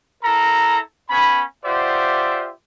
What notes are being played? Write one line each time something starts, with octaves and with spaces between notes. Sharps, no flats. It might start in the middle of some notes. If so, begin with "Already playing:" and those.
E4 A4 A#4 A#5
B3 C#4 G#5 B5
F4 G4 C5 D5 E5 F#5